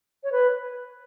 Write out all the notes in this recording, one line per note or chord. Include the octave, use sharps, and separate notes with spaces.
C#5
B4